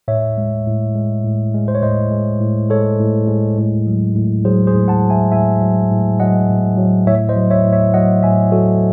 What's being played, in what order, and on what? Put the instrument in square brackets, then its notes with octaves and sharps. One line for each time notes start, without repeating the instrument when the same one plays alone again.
[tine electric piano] A2 C#5 E5
G#3
A2
G#3
A2
G#3
C5
C#5
A2 C5 D#5
G#3
A2
G#3 A4 C#5
A2
G#3
A2
F#3
A2
F#3 G#4 C5
G#4 C5
A2
F#5 A5
F#3
E5 G#5
A2 E5 G#5
F#3
A2
F#3 D#5 F#5
A2
F#3
A2 C#5 E5
C5 D#5
F#3
C#5 E5
A2
C#5 E5
F#3 D#5 F#5
A2 E5 G#5
F#3 F#4 A4